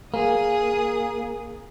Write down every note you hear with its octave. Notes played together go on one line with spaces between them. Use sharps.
A#3 G#4 D#6